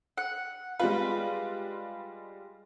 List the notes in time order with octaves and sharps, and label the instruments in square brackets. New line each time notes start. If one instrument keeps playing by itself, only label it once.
[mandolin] F#5
[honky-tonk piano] G3 G#3 F4 [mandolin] B4